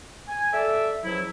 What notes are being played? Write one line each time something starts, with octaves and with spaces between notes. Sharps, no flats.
G#5
A4 D5 E5
C#2 F3 F#3 E4